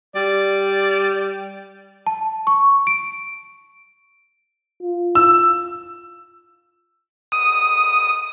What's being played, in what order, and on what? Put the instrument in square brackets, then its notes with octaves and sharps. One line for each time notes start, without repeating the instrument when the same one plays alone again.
[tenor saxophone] G3 [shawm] D5
[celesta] A5
C#6
D7
[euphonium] F4
[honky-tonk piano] E6
[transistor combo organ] D#6